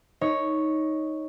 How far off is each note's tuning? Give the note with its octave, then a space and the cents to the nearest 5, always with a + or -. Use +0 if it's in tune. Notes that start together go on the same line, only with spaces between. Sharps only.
D#4 +10 C#5 +0